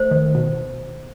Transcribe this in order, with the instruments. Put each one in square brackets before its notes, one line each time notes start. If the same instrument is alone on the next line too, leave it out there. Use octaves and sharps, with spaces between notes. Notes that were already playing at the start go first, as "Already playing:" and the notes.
Already playing: [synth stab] A3 [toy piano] C5
[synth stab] D#3
B2